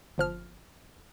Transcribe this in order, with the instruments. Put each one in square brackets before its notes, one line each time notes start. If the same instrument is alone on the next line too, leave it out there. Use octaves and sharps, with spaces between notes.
[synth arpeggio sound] G1 F3 F6